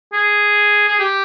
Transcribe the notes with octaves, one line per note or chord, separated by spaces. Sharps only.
G#4
G#4
G4